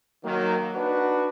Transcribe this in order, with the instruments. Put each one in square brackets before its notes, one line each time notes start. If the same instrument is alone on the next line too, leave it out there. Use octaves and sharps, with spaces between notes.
[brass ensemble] D#3 F#3 A#3
D4 D#4 F#4 B4